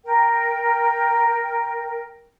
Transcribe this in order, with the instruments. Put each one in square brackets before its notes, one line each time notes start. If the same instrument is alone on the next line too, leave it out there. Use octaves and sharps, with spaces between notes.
[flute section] A#4 G5